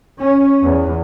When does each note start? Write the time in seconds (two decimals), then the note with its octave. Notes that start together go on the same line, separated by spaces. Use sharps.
0.22 C#4
0.63 E2